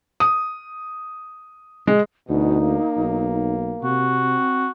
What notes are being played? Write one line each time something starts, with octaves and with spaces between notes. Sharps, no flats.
D#6
G#3
D2 B2 D#4
A#3
B1
C3 F#4
C4